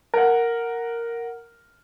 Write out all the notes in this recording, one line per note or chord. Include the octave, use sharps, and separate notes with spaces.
A#4 F#5